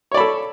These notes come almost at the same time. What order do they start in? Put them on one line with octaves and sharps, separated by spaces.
C#5 D5 B5 A4